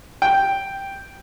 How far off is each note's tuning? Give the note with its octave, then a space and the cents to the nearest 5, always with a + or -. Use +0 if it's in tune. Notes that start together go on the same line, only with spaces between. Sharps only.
G5 +0